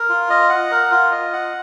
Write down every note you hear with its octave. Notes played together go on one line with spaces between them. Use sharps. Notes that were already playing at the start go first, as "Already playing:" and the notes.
Already playing: A#4
F4
D#5
F#5
A#4
F4
D#5
F#5